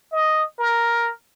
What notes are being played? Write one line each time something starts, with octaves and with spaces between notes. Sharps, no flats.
D#5
A#4